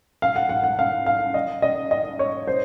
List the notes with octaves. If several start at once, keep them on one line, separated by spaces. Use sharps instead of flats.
F5
F#5
F#5
F#5
F5
F5
D#5
D#5
D#5
C#5
C5